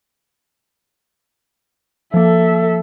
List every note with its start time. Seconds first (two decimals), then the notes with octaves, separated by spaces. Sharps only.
2.14 F3 A#3 A4 E5